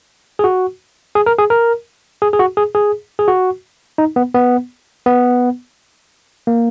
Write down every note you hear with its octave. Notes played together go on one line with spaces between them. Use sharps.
G#4
F#4
G#4
A#4
G#4
A#4
G#4
G#4
F#4
G#4
G#4
G#4
F#4
D#4
B3
B3
B3
A#3